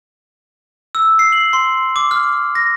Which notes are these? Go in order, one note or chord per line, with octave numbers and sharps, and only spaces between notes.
E6
C7
F#7
C6
D6
F6
A#6